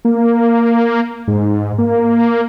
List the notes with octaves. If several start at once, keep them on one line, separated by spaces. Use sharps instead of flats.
A#3
G#2
A#3